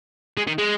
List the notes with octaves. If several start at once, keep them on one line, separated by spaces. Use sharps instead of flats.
G#3
D#3
G#3